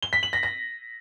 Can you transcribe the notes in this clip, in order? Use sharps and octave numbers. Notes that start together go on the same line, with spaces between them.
G7
B6
F#7
A#6
A#6